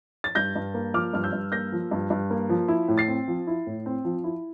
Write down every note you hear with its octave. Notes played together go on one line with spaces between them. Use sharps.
A6
G2 G6 A#6
G2
A#3
F3 D6 F6
G2 F6
E6 G6
G2
A#3 G6 A#6
F3
G2
G2
A#3
F3
E4
A2
A6 C7
C4
F3
E4
A2
C4
F3
E4